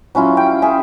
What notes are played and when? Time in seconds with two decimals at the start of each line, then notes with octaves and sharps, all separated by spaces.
0.15 F#3 C#4 E4 F4
0.37 G5
0.62 G#4 E5